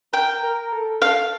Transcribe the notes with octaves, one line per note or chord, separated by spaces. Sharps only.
A#4 G5
A#4
A4
A4 F5